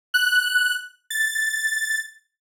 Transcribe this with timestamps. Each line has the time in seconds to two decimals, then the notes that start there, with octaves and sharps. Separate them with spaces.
0.14 F#6
1.10 A6